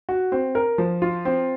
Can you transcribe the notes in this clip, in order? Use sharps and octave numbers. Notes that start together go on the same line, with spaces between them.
F#4
C4
A#4
F3
F4
C4